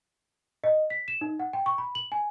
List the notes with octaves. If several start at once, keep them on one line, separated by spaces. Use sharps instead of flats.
D#5
B6
E7
D#4
F#5
G5
C#6
B5
F#7
G#5